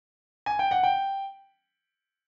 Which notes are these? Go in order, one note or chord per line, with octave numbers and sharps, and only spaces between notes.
G#5
G5
F#5
G5